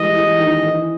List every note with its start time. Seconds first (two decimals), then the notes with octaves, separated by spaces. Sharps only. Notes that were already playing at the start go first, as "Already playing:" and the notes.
Already playing: E3 G3 G#3 D#5
0.16 E3
0.40 D#3
0.64 E3